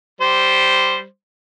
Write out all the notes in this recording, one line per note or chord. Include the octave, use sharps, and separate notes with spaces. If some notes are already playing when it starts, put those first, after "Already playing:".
G3 C5